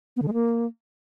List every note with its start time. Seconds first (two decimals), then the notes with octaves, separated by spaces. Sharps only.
0.16 B3
0.22 D3
0.28 G#3
0.33 A#3